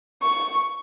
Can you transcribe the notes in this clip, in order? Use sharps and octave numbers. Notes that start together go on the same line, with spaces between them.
C#6